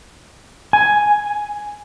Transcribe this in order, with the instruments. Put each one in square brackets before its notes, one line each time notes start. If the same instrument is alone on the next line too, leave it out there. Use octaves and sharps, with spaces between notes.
[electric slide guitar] G#5